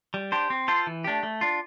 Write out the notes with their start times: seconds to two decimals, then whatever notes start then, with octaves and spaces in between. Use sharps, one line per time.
0.14 G3
0.32 D4 G4 C5
0.50 C4
0.68 F4 A4 C5
0.87 E3
1.04 A3 D4 G4
1.23 A3
1.41 D4 F4